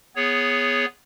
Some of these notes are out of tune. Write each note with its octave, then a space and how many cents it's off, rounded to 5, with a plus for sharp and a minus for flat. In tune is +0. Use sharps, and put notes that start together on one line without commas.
B3 +0 G#4 +0 C#5 +0